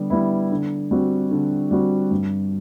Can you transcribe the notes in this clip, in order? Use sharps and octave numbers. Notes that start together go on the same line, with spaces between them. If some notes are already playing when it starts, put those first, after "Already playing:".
Already playing: D3 G3 B3
G3 B3 E4
D3
G3 C4 F#4
D3
G3 C4 F#4
G2